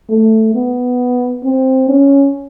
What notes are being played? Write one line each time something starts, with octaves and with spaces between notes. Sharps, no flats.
A3
B3
C4
C#4